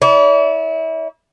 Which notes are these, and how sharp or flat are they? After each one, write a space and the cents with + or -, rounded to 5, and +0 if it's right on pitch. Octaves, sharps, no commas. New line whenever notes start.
E4 -30 D5 -45